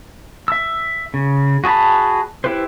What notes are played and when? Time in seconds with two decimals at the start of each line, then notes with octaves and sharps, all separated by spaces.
0.48 E5 E6
1.14 C#3
1.64 F#4 G#4 C5 A5 B5
2.44 E4 G4 B4 C5